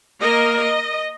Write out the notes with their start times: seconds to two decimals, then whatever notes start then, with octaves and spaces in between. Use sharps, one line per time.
0.20 A#3 A#4 D#5
0.61 D#5